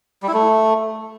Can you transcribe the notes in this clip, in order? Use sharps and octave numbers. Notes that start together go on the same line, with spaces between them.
G3
E4
A3